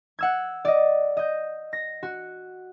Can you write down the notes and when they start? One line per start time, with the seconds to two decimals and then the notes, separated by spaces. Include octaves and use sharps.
0.19 F#5 E6 G#6
0.65 D5 D#5
1.17 D#5 G6
1.73 A#6
2.03 F#4